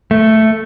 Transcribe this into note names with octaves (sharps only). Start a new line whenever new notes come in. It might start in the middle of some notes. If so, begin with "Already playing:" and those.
A3